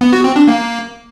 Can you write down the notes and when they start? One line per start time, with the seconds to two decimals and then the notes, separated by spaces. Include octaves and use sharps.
0.01 B3
0.13 F#4
0.24 C4
0.36 D4
0.47 A#3